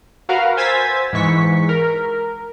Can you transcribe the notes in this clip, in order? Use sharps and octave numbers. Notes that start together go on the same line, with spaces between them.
F#4 A#4 B4 F5 F#5 A#5
C5 G#5 E6 G#6 A6 B6
G#2 E3 C#6 B6
A#4